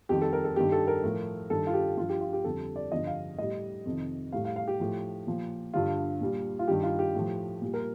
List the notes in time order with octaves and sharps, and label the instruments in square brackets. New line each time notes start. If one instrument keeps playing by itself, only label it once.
[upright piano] F2 D#3 G3 G4
A4
A#4
A4
G2 D#3 G3 G4
A4
A#4
A2 F3
G2 D#3 G3 A4
F4
G4
G2 F4
F3
G4
F4
G4
F2 D3 G3 A4
D5
G2 D3 F3 D#5
F5
A2 G3 D#5
F2 C3 D#3
A2 G3 F5
F5
F5
G4
A2 F3
A#2 F3
G2 D3 G3 F4
A#2 G3
F4
G2 D#3 G3 G4
F4
G4
A2 F3
A#2 G3
A#4